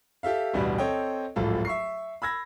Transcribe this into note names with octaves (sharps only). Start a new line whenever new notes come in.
G4 A4 E5 F5
A1 D2 G2 B2 E3 G3
C4 A4 C#5 D#5 G5
D1 G#1 F3 F4 A4
E5 C#6 C7
B5 E6 G#6 A#6